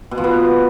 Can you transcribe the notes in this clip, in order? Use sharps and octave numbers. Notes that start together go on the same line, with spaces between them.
B2
F3
B3